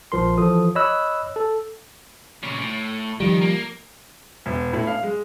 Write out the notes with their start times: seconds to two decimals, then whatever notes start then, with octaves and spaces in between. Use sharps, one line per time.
0.12 A#1 F3 A#4 C6
0.38 E3 F3 A4 D#6
0.75 C#5 D#5 B5 E6 F#6
1.36 A4
2.43 A#2 C#3
2.60 A2
3.20 D#3 F3 G3
3.41 A#3
4.46 E1
4.73 A2
4.87 F5
5.03 G#3